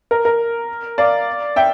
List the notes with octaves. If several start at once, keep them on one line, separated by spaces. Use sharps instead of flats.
A#4
A#4
D5 F5
E5 G5